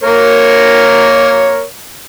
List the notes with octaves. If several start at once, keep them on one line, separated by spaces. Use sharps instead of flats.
A#3 A#4 C#5